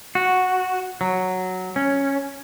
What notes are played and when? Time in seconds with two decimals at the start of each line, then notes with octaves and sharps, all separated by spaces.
0.15 F#4
1.01 F#3
1.76 C#4